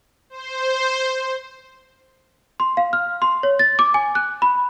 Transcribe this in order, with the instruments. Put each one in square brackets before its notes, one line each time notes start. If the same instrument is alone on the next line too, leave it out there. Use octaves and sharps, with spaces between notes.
[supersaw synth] C5
[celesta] C6
F5
F6
C6
C#5
A6
D6
G#5
F#6
B5